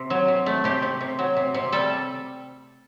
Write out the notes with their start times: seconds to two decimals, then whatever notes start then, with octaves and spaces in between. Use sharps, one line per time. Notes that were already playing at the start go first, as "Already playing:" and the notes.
Already playing: C3
0.10 F#3
0.28 C3
0.46 A3
0.64 C3 G4
0.82 C3
1.00 C3
1.19 F#3
1.37 C3
1.54 C3
1.72 G3 A4